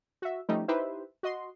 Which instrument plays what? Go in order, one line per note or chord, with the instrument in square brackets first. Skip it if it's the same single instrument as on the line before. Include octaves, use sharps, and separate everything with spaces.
[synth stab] F#4 E5
F3 G3 A3 C#4 D#4
D#4 E4 G4 B4 C5 E5
F#4 D#5 C6